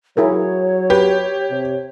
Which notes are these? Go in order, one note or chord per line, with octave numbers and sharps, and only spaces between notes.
F#3 E4 G#4 A#4 C#5
G4 B4
C3